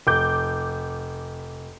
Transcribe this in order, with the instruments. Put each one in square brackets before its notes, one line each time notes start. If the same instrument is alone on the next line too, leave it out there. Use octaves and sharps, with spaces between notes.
[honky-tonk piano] F1 D6 G6